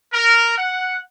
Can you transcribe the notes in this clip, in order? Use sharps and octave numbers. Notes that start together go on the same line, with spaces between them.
A#4
F#5